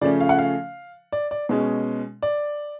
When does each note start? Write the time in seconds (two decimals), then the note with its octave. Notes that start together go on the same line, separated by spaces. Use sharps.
0.01 C#3 F3 A3 C#4 D5
0.20 F5
0.29 F#5
0.38 F5
1.12 D5
1.31 D5
1.49 B2 G#3 C#4
2.23 D5